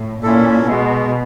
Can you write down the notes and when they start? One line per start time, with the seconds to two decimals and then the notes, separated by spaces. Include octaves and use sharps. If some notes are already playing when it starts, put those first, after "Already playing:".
Already playing: A2
0.23 A#2 C#4 E4 A4
0.67 B2 G#3